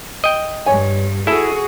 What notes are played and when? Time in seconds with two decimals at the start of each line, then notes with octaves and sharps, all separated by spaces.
0.24 D#5 G5
0.66 G2 C#5 G#5
1.27 E4 F#4 G#4 A4 E5